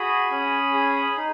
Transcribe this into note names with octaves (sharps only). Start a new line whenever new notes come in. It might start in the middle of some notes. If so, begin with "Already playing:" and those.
Already playing: F#4 G#4 B5 D#6
C#4
G#4
D#4